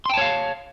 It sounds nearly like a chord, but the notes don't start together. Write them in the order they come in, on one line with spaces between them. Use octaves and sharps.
C6 G5 A5 C#5 F5